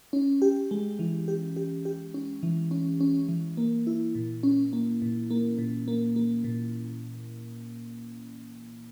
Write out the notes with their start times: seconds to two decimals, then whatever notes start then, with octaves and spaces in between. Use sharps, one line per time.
0.13 C#4
0.42 G4
0.71 G#3
0.99 E3
1.28 G4
1.57 G4
1.85 G4
2.14 C#4
2.43 E3
2.71 C#4
3.01 C#4
3.29 E3
3.57 A#3
3.87 E4
4.15 A#2
4.43 C#4
4.73 A#3
5.02 A#2
5.31 A#3
5.59 A#2
5.88 A#3
6.16 A#3
6.44 A#2